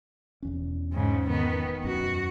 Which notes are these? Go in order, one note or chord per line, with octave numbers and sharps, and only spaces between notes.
E1 E2 C#4
G#2 C#3
D#3 B3
E1 F#2 C#4 F#4